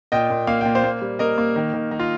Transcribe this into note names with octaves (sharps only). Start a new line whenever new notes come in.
A#2 D#5 G5
A#2
A#3 F5
A#2 G5
C5 F5
A#3
G3
A#3 A#4 D#5
A#3
D#3
D#3
D#3 D#4
F4